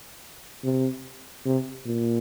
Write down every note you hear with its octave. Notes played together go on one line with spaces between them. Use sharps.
C3
C3
A#2